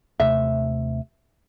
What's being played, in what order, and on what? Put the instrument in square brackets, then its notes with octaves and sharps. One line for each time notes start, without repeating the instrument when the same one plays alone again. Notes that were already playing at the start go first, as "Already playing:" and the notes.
[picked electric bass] D#2 C3 A3 [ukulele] E5